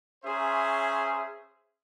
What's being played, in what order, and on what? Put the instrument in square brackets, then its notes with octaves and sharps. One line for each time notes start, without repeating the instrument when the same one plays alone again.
[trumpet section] C#4 G#4 C5 C#5 E5 A#5